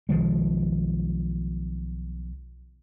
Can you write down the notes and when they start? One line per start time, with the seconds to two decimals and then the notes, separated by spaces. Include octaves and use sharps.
0.09 B1 D#3 F3 G#3